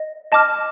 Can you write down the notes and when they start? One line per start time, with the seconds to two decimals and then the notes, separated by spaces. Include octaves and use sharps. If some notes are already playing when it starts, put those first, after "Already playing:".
Already playing: D#5
0.32 D#5 A5 D6 F6